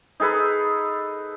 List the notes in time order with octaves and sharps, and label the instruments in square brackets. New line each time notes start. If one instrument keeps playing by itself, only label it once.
[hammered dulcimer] D#4 G#4 A4 B4